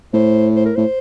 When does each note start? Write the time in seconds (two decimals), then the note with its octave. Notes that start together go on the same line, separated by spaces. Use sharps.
0.14 A2 C5
0.56 C5
0.65 A#4
0.75 A2 C5